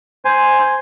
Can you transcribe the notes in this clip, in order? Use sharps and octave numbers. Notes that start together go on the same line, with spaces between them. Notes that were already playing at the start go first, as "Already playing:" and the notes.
C5 G#5